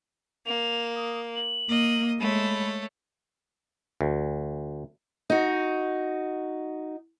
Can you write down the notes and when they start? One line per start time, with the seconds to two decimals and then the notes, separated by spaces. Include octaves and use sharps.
0.46 A#3 F7
0.96 D#6
1.36 F#7
1.69 A#3 D#5
2.20 G#3 A3 C#5 B5
4.01 D2
5.30 D#4 F#4